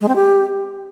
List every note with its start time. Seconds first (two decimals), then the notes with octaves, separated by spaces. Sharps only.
0.01 G#3
0.08 C4
0.16 G4